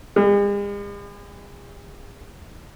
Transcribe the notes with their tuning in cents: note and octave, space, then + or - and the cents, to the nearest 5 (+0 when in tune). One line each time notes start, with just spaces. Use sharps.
G#3 -45